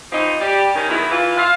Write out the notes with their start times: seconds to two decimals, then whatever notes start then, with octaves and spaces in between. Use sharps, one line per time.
0.12 E3 F3 C4 D#4
0.40 G3 G4
0.75 D#3 C#4
0.89 E2 D#3 F#3 E4
1.11 E3 F4
1.37 F4 E5 F5